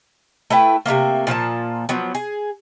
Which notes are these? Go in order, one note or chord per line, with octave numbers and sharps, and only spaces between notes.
A3 E4 B4 G5
C3 F#3 A3 A#3
A#2 F3 A4 A5
F3 F#3 B3
G#4